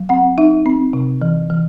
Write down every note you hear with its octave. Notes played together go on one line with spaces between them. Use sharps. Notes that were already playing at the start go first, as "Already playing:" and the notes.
Already playing: F#3
C4 F#5
D#4 E5
C4
C3
E3
E3